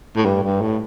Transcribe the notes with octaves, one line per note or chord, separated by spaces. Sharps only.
A2
G2
G2
A2